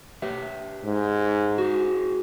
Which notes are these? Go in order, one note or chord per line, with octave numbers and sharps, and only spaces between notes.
G4 B4 E5
G#2
F#4 G#4